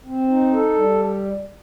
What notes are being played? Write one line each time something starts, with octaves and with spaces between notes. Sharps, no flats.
C4
D#4
A4
G3